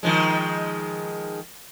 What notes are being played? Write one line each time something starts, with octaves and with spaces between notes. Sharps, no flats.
D#3 F3 G#3